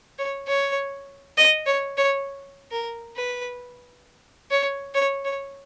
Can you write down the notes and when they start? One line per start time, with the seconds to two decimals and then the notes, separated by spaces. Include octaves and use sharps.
0.19 C#5
0.47 C#5
1.37 D#5
1.66 C#5
1.97 C#5
2.71 A#4
3.17 B4
4.51 C#5
4.95 C#5
5.25 C#5